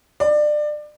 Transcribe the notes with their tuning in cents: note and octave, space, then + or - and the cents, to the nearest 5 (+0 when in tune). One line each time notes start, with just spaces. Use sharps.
D5 +25